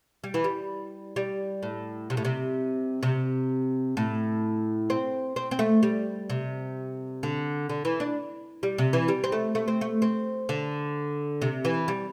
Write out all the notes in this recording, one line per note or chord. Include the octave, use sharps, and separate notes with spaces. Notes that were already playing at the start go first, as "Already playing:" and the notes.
G3
E3
G3
G3
A2
C3
A2
C3
C3
A2
C4
C4
C4
A3
G3
C3
D3
D3
E3
D4
G3
C3
E3
G3
C4
A3
A3
C4
A3
C4
D3
C3
E3
G3